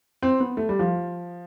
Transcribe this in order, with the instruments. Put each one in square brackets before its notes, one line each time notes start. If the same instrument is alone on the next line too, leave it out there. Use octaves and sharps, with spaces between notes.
[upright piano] C4
B3
A3
G3
F3